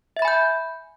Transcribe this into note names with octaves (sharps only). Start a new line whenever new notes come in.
E5 G#5 B5 G6 A6